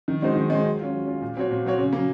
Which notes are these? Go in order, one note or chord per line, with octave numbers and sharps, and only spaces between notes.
D#3
G#3 D#4 F#4 C5
D#3
G#3 D#4 F#4 C5
F#3
C#4 F4
F#3
C#4 F4
A#2
F#3 C4 F#4 C#5
A#2
F#3 C4 F#4 C#5
C#3
F#3 A#3